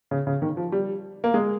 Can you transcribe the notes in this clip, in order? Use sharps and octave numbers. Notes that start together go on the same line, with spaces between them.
C#3
C#3
D#3
F3
G3
A#3
G#3